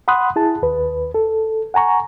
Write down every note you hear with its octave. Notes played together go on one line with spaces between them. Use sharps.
F#5 B5 C6 D#6 F#6
E4 G#4 A5
D#2 B4
A4
F#5 G#5 A#5 C#6